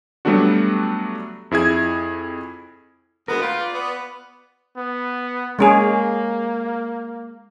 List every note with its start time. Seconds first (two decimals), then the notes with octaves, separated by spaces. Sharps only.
0.25 F#3 G3 A3 B3 D4 F#4
1.51 F2 E4 G#4 G#6
3.28 D2 G#3 B3 A#4
3.42 F4 B4 G5
3.61 D5
3.73 B3
4.77 B3
5.59 G#3 A#3 C#4 G#4